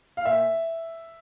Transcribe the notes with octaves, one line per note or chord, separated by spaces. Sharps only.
F5
A#2 E5